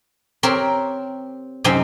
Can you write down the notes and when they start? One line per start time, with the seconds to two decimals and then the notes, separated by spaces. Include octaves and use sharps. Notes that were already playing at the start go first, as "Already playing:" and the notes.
0.43 C4 G4 A#4 C#5
1.64 F#2 C3 C4 D#4